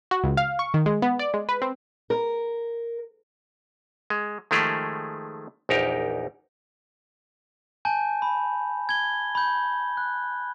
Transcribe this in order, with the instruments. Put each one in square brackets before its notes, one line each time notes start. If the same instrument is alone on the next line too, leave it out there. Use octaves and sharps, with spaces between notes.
[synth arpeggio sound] F#4
C#2
F5
C#6
D#3
G#3
B3
D5
G#3
B4
C4
[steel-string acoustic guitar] A#4
[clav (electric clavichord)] G#3
D#3 F3 G#3 A3 G4 G#4
A#1 E2 D#4 G4 A#4
[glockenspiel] G#5 A5 G6
B5
G#6 G7
B5 G6
F#6